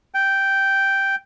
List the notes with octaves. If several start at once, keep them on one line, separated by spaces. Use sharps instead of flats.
G5